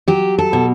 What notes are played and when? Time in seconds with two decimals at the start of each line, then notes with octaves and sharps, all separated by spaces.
0.08 F#3 G4
0.39 A4
0.53 B2